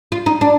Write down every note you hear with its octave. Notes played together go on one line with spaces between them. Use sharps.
F4
D#4
D4